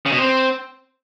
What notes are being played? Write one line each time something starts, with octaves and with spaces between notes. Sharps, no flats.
C#3
B2
C4